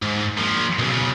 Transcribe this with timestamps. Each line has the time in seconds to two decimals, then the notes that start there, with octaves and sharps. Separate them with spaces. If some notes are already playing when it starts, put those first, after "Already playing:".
0.02 G#2
0.38 A#2 F3
0.79 B1 C#3